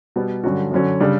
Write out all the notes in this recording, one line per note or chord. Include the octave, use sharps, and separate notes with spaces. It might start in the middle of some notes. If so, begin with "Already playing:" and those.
B2 G3 B3
G2 D3 F#3 C#4 F#4
F#2 D3 F#3 C#4
C#3 G3 D4